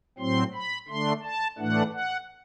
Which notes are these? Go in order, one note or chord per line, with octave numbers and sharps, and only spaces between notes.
A2 F#3 C4 C6
B5
D3 A3 D4 C6
A5
A2 E3 A3 D4 F#5
F#5